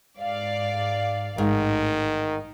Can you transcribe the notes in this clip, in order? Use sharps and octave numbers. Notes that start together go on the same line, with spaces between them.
G#2 D5 F5
A1 G#2 D#3